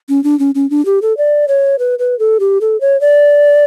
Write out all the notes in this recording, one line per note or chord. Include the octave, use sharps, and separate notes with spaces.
C#4
D4
C#4
C#4
D4
G4
A4
D5
C#5
B4
B4
A4
G4
A4
C#5
D5